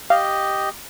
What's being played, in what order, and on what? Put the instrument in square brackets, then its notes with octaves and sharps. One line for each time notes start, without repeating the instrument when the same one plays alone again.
[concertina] G4 D#5 [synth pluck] F5